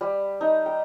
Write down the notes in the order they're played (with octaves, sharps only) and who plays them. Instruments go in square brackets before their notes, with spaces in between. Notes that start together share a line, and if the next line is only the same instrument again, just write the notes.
[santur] G3
D#4
G5